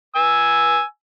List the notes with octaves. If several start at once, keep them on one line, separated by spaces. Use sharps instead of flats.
G#5 E6